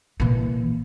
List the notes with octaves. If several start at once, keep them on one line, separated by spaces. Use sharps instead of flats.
A#2 E3